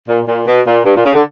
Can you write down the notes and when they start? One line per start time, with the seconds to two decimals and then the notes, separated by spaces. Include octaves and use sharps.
0.08 A#2
0.28 A#2
0.46 B2
0.66 A#2
0.85 G2
0.96 A#2
1.05 C#3
1.14 D3